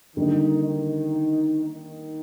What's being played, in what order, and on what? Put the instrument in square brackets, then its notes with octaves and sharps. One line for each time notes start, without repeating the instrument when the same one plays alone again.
[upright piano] D3 G3 A#3 [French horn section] D#3 D#4
[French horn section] D#3 D#4
D#3 D#4